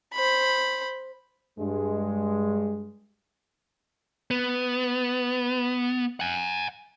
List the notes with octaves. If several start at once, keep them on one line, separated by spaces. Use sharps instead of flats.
C5 B5
G2 G#3
B3
F#5 G#5